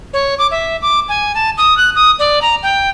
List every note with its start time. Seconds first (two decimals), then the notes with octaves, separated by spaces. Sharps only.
0.13 C#5
0.39 D6
0.51 E5
0.82 D6
1.09 G#5
1.35 A5
1.58 D#6
1.77 F#6
1.95 D#6
2.19 D5
2.42 A#5
2.63 G5